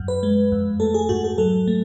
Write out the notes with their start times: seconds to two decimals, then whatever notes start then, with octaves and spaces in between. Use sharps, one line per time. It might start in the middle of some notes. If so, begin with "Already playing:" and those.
Already playing: F#2
0.08 B4
0.23 G#3
0.52 F2
0.80 A3 A4
0.94 G#4
1.09 G#2 F#4
1.24 G#4
1.38 F#3 A4
1.68 A3